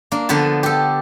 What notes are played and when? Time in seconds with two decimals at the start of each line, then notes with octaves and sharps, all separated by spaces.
0.12 A#3 D4
0.29 D3 F3 B3 B4 A5
0.63 G4 A4